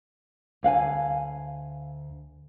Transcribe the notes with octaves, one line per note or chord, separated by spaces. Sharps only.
D2 F5 F#5 G#5